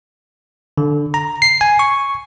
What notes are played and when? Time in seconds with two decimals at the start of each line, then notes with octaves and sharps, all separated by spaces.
0.78 D3
1.14 A#5
1.42 C7
1.61 G#5
1.79 C#6